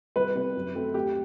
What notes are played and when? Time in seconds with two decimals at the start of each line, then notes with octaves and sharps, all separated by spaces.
0.16 C2 B4
0.35 C3 G3 B3
0.55 F#2
0.75 F#3 A3 C4
0.94 D2 G4